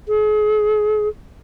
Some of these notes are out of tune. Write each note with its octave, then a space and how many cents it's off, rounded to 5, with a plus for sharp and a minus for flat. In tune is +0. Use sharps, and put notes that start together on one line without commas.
G#4 +35